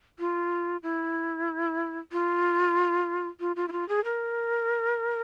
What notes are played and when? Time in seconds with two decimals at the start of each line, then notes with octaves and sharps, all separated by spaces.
0.19 F4
0.83 E4
2.12 F4
3.40 F4
3.56 F4
3.68 E4
3.72 F4
3.89 G#4
4.04 A#4